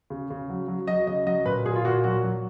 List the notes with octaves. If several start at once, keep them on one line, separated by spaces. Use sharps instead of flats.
C#3
C#3
F#3
F#3
F#3 D#5
C#3 D#5
F#3 D#5
A#2 B4
A#2 G#4
F4
A#2 F#4
F#3 F#4
F#3